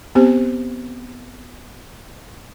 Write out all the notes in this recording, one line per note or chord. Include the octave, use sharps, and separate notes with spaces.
B3 C4 G4 C5